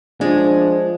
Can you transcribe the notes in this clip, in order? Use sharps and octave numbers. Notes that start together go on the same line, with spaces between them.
F3 G#3 D4